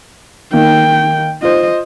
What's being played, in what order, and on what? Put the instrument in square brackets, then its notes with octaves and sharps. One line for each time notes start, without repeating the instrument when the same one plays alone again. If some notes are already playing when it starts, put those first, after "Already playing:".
[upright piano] D#3 A#3 [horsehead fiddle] G5
[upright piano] F4 C5 [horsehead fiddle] D#5